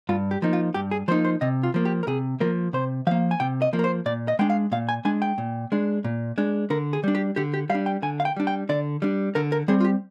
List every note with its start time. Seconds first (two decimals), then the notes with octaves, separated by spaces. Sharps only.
0.09 G2 F4
0.31 G4
0.42 F3 A#3 D#4
0.53 F4
0.74 G2 G4
0.91 G#4
1.08 F3 A#3 D#4 C5
1.25 C5
1.41 C3 D#5
1.63 F4
1.74 F3 A#3
1.85 G4
2.03 A#4
2.07 C3 G#4
2.40 F3 A#3 A#4
2.73 C3 C5
3.07 F3 A#3 F5
3.31 G#5
3.40 C3 G5
3.62 D#5
3.73 F3 A#3
3.79 A#4
3.84 C5
4.06 A#2 D5
4.28 D#5
4.39 G#3 D4 G5
4.50 F5
4.72 A#2 F5
4.89 G#5
5.05 G#3 D4 G#5
5.22 G5
5.38 A#2
5.72 G#3 D4
6.04 A#2
6.38 G#3 D4
6.70 D3 A#4
6.93 G#4
7.04 G3 D4
7.15 G4
7.36 D3 G4
7.54 G4
7.70 G3 F5
7.75 D4
7.86 G5
8.02 D3 G#5
8.20 F5
8.25 G5
8.36 G3 D4
8.47 G5
8.69 D3 D5
9.02 G3 D4
9.35 D3 A#4
9.52 A#4
9.68 G3 C4 G#4
9.80 F4
9.85 G4